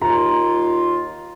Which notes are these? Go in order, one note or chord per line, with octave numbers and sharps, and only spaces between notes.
D#2 F4 A#5